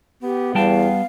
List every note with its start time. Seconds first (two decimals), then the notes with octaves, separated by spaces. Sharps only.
0.23 B3 G4
0.55 E2 G3 F5 G5 A5